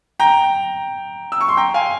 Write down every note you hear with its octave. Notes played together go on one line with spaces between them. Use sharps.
G5 A#5
E6
C#6
C6
G5 A#5
F5 G#5